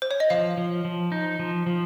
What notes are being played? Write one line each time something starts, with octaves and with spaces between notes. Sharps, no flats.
C5
C#5
D#5
F3 F5
F3
F3
D#4
F3
F3